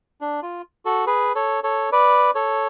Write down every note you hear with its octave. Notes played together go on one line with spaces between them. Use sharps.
D4
F4
F#4 A4
G#4 B4
A4 C#5
A4 C#5
B4 D5
A4 C#5